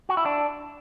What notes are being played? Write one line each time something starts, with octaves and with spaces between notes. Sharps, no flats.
F#4
E4
D4